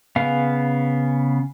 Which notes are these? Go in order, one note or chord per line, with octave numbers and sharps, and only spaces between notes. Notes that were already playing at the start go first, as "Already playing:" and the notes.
C#3 B3 F5